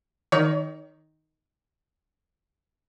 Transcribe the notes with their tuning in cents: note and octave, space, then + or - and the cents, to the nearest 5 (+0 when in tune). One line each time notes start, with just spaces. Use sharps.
D#3 +5 C#5 +40